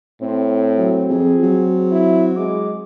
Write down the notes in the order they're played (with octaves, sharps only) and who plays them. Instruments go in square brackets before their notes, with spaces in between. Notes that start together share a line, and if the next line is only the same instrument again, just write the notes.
[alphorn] A2 [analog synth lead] C4
[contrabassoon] F#3
[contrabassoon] F2 [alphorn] G#4
[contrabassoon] F#3
[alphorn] E4
[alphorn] G#3 [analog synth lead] D6